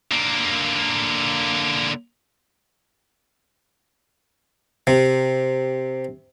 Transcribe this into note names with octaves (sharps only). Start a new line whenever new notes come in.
D3 A#3
C3